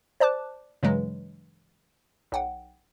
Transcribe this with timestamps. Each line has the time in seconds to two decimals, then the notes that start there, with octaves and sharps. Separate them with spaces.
0.20 C5 D5 A5 D6 F#6
0.83 G2 C#3 E3 F#3 G#3
2.32 B1 F#5 G5